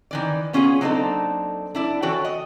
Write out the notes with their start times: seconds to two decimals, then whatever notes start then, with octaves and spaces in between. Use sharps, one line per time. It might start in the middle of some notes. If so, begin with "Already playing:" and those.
0.11 D#3 E3 D5
0.53 B3 C#4 F4 G4 G#4
0.81 F#3 A#3 C4 D4 D#4 A4
1.75 D4 E4 D5
2.02 E3 F#4 A4 C#5 G5
2.25 D#5